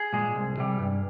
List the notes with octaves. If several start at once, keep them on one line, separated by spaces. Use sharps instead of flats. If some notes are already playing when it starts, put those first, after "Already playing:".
Already playing: G#4
A#2 G#3
C2
C3 G3
G2